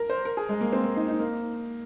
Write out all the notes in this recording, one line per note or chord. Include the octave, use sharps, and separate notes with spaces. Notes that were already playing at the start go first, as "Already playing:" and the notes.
Already playing: A#4
C5
A#4
G#4
G#3
A#3
C4
A#3
D#4
D#4
A#3